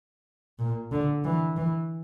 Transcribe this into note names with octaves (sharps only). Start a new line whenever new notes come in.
A#2
D3
E3
E3